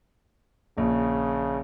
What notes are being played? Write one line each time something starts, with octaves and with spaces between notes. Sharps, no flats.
A#1 C#3